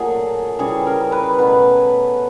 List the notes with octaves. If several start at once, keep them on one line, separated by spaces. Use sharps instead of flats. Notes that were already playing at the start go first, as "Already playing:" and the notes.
Already playing: A#2 F#3 A3 G#4
C#3 E3 G3 G#4
A#4
B4
B2 F#3 A3 B4